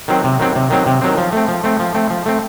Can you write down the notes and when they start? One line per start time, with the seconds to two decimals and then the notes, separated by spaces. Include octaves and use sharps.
0.08 D#3 F#3 C4
0.24 C3
0.39 D#3 F#3 C4
0.55 C3
0.70 D#3 F#3 C4
0.86 C3
1.02 D#3 F#3 C4
1.18 F3
1.33 A3 C4
1.48 F3
1.64 A3 C4
1.80 F3
1.95 A3 C4
2.10 F3
2.26 A3 C4